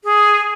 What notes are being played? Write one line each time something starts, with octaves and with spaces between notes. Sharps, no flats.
G#4